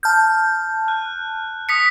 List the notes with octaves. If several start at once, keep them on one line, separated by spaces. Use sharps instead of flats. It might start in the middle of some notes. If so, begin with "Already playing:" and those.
A5 F6 G6
F#6
D#6 B6 C#7